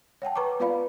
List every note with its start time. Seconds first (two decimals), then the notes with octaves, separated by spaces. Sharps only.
0.22 C#5 F#5 G5 A5
0.36 B4 A#5 C#6 D6
0.60 B3 F4 B4 D5 F5 B5